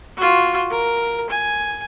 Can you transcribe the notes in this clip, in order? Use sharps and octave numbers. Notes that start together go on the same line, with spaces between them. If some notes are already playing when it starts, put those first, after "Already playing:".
F4 F#4
A#4
G#5